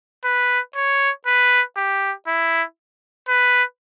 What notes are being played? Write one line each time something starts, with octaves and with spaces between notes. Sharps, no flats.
B4
C#5
B4
G4
E4
B4